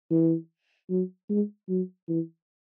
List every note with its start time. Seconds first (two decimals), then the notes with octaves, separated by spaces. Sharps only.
0.10 E3
0.90 F#3
1.30 G#3
1.69 F#3
2.09 E3